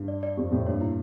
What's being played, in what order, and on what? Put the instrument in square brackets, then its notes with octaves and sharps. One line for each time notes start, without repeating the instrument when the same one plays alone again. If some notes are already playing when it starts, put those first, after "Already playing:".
Already playing: [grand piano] G2
[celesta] D5
D5
[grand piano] F2 [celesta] G4
[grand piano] F2 A2 [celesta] G4
[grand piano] G2 A#2 [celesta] C#5
[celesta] E4